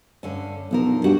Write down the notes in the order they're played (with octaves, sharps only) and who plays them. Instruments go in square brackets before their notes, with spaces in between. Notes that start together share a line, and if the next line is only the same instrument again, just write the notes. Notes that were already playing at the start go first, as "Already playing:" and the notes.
[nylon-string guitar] G2 D3 C#4
[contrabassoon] B1 [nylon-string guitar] D3 F3 A#4
[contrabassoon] G2 [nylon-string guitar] F#4 G4 F#5